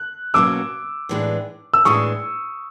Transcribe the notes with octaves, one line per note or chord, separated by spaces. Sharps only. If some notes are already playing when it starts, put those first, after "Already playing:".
Already playing: F#6
B2 F#3 A#3 C#4 D6 E6
A2 E3 G#3 B3 D4
E6
A2 E3 G#3 B3 D4 C#6 D#6